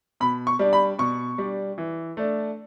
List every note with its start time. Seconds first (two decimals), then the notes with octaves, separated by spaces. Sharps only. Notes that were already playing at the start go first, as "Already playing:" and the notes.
0.20 B2 B5
0.47 C#6
0.59 G3 D4
0.73 B5
0.99 B2 C#6
1.38 G3 D4
1.78 E3
2.17 A3 D4